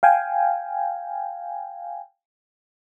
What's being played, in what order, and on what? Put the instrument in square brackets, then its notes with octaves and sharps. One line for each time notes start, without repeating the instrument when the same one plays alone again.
[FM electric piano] F5 G5 G#5